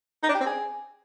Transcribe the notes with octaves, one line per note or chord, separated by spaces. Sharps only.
D#4
D4
G4
C4
G#4